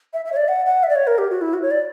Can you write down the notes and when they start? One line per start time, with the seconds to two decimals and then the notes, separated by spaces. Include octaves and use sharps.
0.14 E5
0.25 E5
0.32 C#5
0.37 D5
0.48 F#5
0.66 F#5
0.83 E5
0.89 D5
0.96 C#5
1.07 A#4
1.18 G4
1.30 F#4
1.41 E4
1.53 F#4
1.62 C#5
1.71 D5